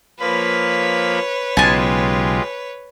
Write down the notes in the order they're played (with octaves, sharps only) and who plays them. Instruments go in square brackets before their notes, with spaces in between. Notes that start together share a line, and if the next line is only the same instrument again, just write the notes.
[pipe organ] F3 A#3 B5 [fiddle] B4 C#5
[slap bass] B1 C#3 [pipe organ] G#3 F4 G4 [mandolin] G#5 A5